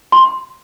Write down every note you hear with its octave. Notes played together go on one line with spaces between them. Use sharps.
C6